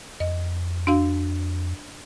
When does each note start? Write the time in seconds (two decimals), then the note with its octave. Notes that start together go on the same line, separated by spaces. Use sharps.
0.20 F2 D#5
0.87 D4 F#4 F5